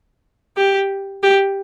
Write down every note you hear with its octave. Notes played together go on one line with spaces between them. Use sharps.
G4
G4